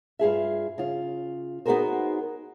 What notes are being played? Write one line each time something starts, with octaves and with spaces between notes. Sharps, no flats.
G2 F4 G#4 E5
C#3 F4
B3 D#4 F#4 G#4 A#4 C5